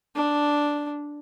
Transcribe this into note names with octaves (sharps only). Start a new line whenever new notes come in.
D4